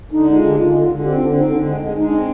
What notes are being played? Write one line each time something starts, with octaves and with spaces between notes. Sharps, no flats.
D3 D#4
G#3 D#4
F4
D3
G4
D3 F4
D3
D3
F4
C4 G4
D4
D3
D4
C4 D#4
D3
G#3
G#3
G#3 D#4
C4 D4